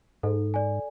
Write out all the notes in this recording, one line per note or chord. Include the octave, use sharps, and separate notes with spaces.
G#2 A4
D5 G#5